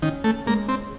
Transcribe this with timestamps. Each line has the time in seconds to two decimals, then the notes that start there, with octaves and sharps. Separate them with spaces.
0.02 D#3 C#4
0.24 A3
0.46 G#3 A#3
0.69 C4